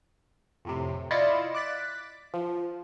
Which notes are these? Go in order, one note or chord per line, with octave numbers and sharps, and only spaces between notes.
F2 A2 C3
E4 F4 D5 D#5 C#7 E7
D6 F#6 A6 B6
F3